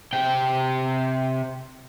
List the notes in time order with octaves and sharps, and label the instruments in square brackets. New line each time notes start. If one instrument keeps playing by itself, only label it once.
[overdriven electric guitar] C3 G5